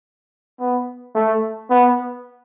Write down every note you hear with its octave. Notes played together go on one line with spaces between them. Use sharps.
B3
A3
B3